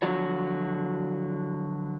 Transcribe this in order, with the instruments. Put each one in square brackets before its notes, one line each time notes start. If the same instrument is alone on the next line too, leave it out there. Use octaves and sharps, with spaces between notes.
[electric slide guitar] D3 F3 F#3 F#4 C#5